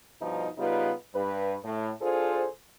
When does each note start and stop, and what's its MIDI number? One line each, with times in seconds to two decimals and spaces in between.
0.20 0.48 43
0.20 0.48 47
0.20 0.48 53
0.20 0.48 63
0.58 0.92 49
0.58 0.92 55
0.58 0.92 59
0.58 0.92 63
0.58 0.92 65
0.58 0.92 71
1.14 1.56 43
1.14 1.56 71
1.64 1.90 45
2.01 2.47 62
2.01 2.47 65
2.01 2.47 68
2.01 2.47 69
2.01 2.47 72